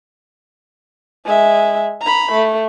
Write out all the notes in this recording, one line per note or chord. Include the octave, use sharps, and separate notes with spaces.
G#3 E5
A#5 B5
A3